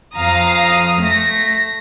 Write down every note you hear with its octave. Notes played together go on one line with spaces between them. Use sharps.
F2 F5 A#5 D#6
A3 A#6